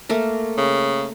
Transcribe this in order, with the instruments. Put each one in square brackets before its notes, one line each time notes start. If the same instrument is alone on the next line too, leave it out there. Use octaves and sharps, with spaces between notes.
[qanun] A3 A#3 A#4
[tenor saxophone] C#3